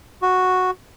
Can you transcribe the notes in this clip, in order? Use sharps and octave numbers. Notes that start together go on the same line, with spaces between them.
F#4